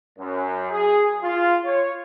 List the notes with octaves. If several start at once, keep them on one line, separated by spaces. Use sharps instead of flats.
F#2
G#4
F4
C#5